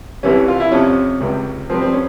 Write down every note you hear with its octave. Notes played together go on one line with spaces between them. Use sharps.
C2 C3 E3 G3 C#4
F4
E4
F2 C3 F3 C#4
C#2 C3 G3
G2 F3 C4
C4
C#4